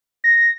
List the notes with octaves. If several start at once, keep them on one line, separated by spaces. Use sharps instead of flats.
A#6